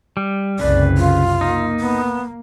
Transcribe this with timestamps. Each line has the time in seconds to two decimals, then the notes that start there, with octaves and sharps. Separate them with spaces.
0.17 G3
0.59 F#1 C2 C#3 B4 D5
0.98 F4
1.41 A#3 D#4
1.80 B3